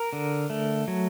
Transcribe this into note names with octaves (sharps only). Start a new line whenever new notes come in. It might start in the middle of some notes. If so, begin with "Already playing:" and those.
Already playing: A#4
D3
A3
F#3